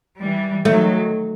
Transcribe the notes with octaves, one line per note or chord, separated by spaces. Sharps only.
E3 G3
D#3 F#3 A3